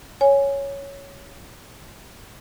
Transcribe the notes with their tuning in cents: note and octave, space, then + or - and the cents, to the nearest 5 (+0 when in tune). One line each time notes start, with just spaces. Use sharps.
C#5 +0 G#5 +0